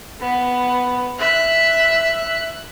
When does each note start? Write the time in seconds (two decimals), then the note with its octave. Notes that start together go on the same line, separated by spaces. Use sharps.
0.21 B3
1.19 E5 F#6